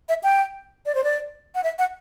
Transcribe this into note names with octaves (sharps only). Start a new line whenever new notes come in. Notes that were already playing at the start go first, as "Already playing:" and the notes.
E5
G5
D5
C5
D5
F#5
E5
F#5